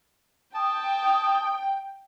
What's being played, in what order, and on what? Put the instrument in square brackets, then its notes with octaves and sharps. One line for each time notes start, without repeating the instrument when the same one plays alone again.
[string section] G5 [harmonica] A5 [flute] D#6